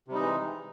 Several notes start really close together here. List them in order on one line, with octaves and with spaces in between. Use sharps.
C3 G3 D#4 E3 G#3